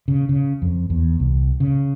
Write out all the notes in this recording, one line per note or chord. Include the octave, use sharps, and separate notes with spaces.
C#3
C#3
F2
E2
C2
C#3